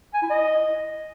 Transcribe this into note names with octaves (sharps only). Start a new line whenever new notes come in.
G#5
E4
D#5